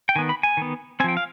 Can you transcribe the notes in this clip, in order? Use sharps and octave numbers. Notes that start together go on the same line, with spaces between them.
G5
D#3 B3 G#5
B5
G#5
D#3 B3
F3 C4 G5 G#5
F5